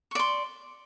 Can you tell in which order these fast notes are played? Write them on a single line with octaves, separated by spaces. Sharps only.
C#6 D5 C6